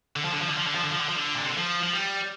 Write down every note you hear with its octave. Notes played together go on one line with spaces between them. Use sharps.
D3
F3
D3
F3
D3
F3
D3
F3
D3
F3
D3
F3
D3
A#2
C3
D3
F3
F3
G3